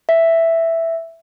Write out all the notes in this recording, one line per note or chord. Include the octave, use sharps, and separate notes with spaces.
E5